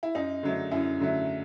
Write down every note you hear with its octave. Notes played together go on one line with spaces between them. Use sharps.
E4
F#2 D#4
D3 F#3 A3
F#2 E4
D3 F#3 A3